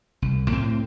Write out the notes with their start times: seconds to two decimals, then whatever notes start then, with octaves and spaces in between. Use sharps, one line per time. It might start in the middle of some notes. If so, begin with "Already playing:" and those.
0.22 C2
0.51 A2 C4